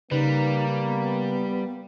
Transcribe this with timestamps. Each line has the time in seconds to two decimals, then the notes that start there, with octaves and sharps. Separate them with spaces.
0.11 C#3 G3 A#3 D#4 B4
0.84 B3